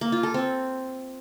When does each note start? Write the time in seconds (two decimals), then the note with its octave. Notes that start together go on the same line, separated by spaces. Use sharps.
0.01 A#3
0.12 F4
0.23 A4
0.34 C4